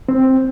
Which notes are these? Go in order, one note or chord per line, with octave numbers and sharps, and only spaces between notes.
C4